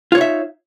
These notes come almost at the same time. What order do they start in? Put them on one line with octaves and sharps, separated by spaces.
F4 C#5 D#4 E5